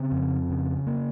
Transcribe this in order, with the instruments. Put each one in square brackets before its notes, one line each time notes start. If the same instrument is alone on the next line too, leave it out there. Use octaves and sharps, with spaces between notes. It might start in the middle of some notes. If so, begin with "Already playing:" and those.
Already playing: [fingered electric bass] C#3 C4
F2
C#3
A#3